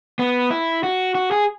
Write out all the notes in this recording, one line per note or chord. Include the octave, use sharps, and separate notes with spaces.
B3
E4
F#4
F#4
G#4